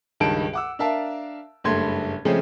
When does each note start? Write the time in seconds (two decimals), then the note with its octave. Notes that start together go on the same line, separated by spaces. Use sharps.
0.20 C#2 G2 D#3 A5 D7
0.53 F#5 D6 E6
0.79 D4 A#4 E5 F5 A5
1.64 F#1 G2 A3 C6 G#6
2.25 C#3 F3 G#3 A3 C4 C#4